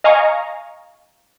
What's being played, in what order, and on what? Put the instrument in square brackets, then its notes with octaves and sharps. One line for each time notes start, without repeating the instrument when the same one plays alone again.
[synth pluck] D#5 F5 G#5 A#5 C#6